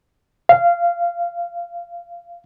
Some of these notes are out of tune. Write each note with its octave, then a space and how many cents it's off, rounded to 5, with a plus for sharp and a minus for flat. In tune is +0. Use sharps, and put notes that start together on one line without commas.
F5 -15